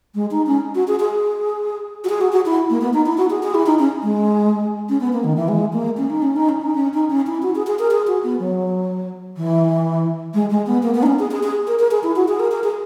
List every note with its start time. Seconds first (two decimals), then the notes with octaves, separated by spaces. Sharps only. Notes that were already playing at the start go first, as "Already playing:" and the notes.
0.15 G#3
0.31 D#4
0.47 C#4
0.75 F#4
0.88 G#4
1.00 G#4
2.04 F#4
2.09 G#4
2.21 F#4
2.32 F#4
2.46 E4
2.70 A#3
2.81 B3
2.93 D#4
3.06 E4
3.18 F#4
3.30 G#4
3.43 G#4
3.55 E4
3.66 D#4
3.79 C#4
4.03 G#3
4.89 C#4
5.00 B3
5.13 A#3
5.24 D#3
5.37 E3
5.48 G#3
5.73 A#3
5.97 C#4
6.10 D#4
6.22 C#4
6.36 D#4
6.49 C#4
6.61 D#4
6.75 C#4
6.94 D#4
7.10 C#4
7.27 E4
7.42 F#4
7.55 G#4
7.67 G#4
7.79 A#4
7.91 G#4
8.07 F#4
8.24 B3
8.39 F#3
9.37 E3
10.34 G#3
10.50 G#3
10.67 B3
10.83 A#3
10.94 B3
11.03 D#4
11.06 C#4
11.19 G#4
11.31 G#4
11.43 G#4
11.67 A#4
11.79 A#4
11.91 G#4
12.03 E4
12.16 F#4
12.28 G#4
12.40 A#4
12.52 A#4
12.64 G#4